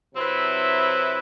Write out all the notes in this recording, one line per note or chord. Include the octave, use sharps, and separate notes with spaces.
C3 F#3 C4 E4 B4